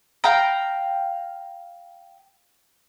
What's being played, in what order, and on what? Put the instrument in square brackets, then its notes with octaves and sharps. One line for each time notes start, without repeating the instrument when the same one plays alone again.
[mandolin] F5 G5 A#5